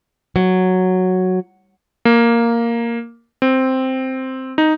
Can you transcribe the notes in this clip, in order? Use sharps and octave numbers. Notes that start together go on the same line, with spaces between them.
F#3
A#3
C4
D#4